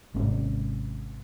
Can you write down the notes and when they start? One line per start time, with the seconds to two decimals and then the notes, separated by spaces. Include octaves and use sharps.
0.14 G#1 G#2 C3 C#4